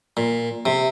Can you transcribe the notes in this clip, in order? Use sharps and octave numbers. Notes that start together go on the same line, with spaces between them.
A#2
C3